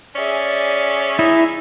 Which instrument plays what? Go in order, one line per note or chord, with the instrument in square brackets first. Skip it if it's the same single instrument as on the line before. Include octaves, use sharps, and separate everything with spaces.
[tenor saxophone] C#4 [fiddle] G#4 E5 [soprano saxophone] D5
[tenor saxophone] D#4 [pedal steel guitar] E4